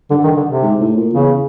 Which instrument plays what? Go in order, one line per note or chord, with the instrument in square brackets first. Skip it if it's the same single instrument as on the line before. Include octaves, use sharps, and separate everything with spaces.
[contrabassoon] G2 [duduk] D3
[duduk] D#3
D3
C3
[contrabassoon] G#2
A2
A#2
[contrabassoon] E2 [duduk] C#3